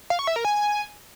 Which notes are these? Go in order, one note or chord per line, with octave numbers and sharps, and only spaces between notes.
F5
C#6
E5
A#4
G#5